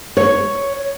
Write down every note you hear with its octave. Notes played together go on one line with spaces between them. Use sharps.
C#5